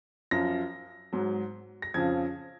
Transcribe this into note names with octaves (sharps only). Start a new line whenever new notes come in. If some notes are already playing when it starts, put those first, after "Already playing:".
F#2 F3 A#6
G#2 F#3
A#6
F2 C#3 F3 G#6